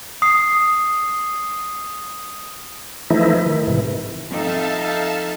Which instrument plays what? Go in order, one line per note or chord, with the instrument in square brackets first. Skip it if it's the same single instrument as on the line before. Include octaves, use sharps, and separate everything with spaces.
[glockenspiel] D#6 C7
[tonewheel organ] E3 F3 A3 D#4 E4
D#3
G#2 C3 E3
[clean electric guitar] F2 [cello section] D#4 A4 [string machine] E5 F5 A5